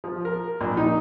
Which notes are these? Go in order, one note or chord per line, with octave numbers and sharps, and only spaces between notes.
F3
A#4
A#1
D#4